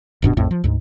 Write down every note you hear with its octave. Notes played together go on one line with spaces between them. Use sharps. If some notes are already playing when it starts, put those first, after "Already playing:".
D#1 G2 B2 D4
A#1 F2 A2
F3
D2 G#2